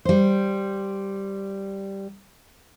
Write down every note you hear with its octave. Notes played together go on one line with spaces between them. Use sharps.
G3 C5